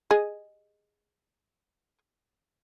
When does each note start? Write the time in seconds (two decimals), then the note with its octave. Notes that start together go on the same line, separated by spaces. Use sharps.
0.11 G#4 D#5